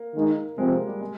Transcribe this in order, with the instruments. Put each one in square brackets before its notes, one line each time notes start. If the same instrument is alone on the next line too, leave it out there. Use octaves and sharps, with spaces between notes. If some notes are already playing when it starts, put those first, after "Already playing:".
Already playing: [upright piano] A#3
[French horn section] D#3 G#3 D#4
[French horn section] C3 F3 C4 [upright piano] G#3
[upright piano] A#3
G3
G#3